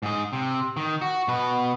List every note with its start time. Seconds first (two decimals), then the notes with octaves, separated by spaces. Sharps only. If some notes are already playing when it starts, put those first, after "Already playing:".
0.03 G#2 G#4
0.33 C3
0.77 D#3
1.02 F#4
1.28 B2 B4